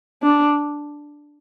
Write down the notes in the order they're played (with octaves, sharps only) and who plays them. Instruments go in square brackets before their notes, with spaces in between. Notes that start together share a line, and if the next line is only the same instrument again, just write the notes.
[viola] D4